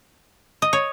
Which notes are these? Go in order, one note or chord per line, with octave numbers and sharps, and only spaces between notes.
D#5
C#5